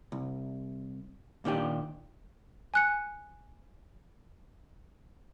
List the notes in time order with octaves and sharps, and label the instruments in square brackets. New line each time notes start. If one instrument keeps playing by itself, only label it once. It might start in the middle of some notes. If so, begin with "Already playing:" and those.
[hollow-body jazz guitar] C2
A#2 D#3 D4 G4
[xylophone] G#5 F#6 C#7